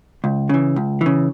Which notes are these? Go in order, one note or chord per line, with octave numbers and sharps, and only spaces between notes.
C#2
C#3 E3
C#2
E3
C#3